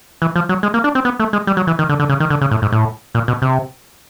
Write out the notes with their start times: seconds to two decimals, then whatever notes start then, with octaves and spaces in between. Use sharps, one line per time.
0.22 E3
0.36 F3
0.49 F#3
0.63 G#3
0.74 A#3
0.84 D4
0.95 C4
1.05 B3
1.20 A3
1.33 G#3
1.47 G3
1.57 F#3
1.67 E3
1.79 D#3
1.89 D3
2.00 D3
2.09 C#3
2.20 D#3
2.30 D3
2.41 C#3
2.51 A2
2.62 G#2
2.72 A2
3.15 A#2
3.28 B2
3.42 C3